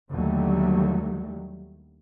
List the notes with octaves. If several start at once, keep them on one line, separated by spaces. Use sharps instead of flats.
D#2 D3 F#3 G3 A3